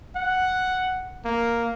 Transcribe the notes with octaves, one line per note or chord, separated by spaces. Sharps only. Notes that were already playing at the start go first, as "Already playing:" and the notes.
F#5
A#3